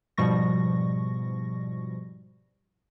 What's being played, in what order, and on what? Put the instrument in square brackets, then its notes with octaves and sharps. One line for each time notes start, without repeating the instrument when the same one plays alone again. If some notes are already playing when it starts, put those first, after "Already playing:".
[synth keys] G#2 B2 F3 G3 C#6 A#6